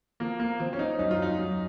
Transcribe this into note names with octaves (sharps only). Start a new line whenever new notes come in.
F3 A#3
A#3
F3 C4
C#4
D#4
F#2 D#4
F4
D#4
F#2